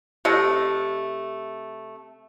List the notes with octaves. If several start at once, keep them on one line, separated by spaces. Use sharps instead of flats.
C3 A3 D#5